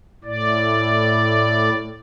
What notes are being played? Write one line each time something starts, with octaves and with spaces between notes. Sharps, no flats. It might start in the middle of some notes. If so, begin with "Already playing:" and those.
A2 D5